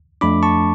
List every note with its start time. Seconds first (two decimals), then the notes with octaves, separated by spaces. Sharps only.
0.21 F2 F3 A3 D4 B5 D6
0.43 A5 C#6